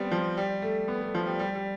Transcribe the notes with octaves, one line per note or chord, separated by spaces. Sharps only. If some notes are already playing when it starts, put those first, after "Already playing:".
Already playing: G3 B3 C4
F3
G3
A3
B3
A3
F3
G3
G3
G3